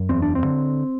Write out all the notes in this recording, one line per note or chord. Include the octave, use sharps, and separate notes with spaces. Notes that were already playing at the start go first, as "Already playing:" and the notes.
Already playing: F#2
E2 C4
D4
C4
D3